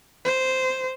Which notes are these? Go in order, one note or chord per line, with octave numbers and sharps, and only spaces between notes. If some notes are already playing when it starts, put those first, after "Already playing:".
C5